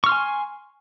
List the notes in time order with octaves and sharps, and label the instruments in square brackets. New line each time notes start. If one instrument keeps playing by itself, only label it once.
[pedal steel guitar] C#6
F6
C6
G#5